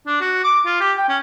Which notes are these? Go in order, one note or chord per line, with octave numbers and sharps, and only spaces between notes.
D4
F#4
D6
F4
G4
G5
C#4